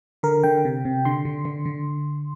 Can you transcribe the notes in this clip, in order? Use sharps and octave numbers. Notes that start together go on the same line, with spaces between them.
D3 A#4
D3 G5
C3
C3
D3 C6
D3
D3
D3